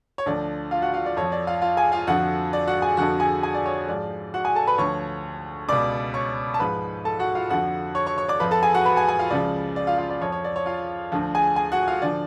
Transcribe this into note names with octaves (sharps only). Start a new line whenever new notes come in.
C#5
D2 D3 F3 D5
F4 F5
F#4 F#5
F4 F5
D5
F2 F3 C#5
D5
F4 F5
F4 F5
G#4 G#5
F4 F5
F2 D3 F3 F#4 F#5
D5
F#4 F#5
G#4 G#5
F2 D3 F3 F#4 F#5
G#4 G#5
G#4 G#5
D5
C#5
G#2 F3 D5
F#4 F#5
G#4 G#5
A4 A5
B4 B5
D2 D3 F3 C#5 C#6
C#2 B2 D5 D6
C#5 C#6
A5
G#2 F3 B4 B5
A4 A5
F#4 F#5
F4 F5
F2 D3 F3 F#4 F#5
C#5 C#6
C#5 C#6
C#5 C#6
D5 D6
F2 F3 B4 B5
A4 A5
G#4 G#5
F#4 F#5
B4 B5
G#4 G#5
G#4 G#5
F4 F5
C#2 C#3 F3 D5
D5
F4 F5
F4 F5
D5
F2 F3 C#5
C#5
D5
C#5
F4 F5
D2 D3 F3
G#4 G#5
G#4 G#5
F#4 F#5
F4 F5
D3 F3 D5